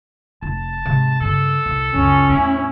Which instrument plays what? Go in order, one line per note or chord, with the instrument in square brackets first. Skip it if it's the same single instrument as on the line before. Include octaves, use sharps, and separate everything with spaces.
[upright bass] F1 [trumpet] A5
[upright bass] G#2 C3
[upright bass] G2 C#3 [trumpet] A4
[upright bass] C2
[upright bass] C#2 F#2 [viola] C#4
[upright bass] E2 A2 [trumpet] E4